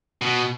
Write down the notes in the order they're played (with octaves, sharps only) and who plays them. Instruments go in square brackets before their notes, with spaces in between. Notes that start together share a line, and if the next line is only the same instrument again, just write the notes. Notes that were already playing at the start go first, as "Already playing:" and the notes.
[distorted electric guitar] B2